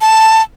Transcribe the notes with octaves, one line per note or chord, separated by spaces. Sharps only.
A5